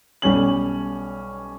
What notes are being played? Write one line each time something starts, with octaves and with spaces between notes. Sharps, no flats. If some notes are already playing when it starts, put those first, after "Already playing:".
B1 G3 C#4 F#7